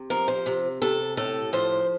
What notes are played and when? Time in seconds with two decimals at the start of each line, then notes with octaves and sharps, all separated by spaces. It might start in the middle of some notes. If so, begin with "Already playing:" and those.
Already playing: C3
0.10 F3 A#4
0.28 C5
0.46 C3
0.82 C3 A4
1.17 A2 A4
1.53 F3 C5